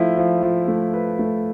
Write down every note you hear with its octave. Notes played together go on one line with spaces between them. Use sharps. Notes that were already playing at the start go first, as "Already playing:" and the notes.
Already playing: F3 A3 E4
F3
F3
A3
B4
A3